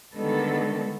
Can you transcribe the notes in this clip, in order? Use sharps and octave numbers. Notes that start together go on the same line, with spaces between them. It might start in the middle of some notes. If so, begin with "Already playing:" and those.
D3 D#3 G3 G#3 B3 A4